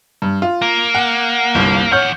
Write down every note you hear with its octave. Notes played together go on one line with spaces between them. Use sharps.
G2
F4
A#3
F#5
G1 C2
E2 C#5 F#5 F6 G6